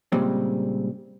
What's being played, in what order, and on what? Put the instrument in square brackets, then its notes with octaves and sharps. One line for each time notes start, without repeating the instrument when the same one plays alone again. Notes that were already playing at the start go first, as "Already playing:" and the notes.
[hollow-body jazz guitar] A#2 C#3 G3 G#3 C4